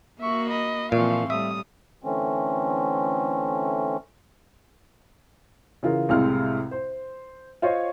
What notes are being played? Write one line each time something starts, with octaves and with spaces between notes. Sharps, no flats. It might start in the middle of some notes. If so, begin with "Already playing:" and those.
A#3 F#4 E5 C#6
D#5 B5
A#2 E3 F3 C4 F5 C#6
A2 G3 E5 D#6
D3 E3 A3 C4 C#4
C#3 E3 F4 A#4
C2 A2 C3 G#3 F5 F6
C5
F4 C5 C#5 D#5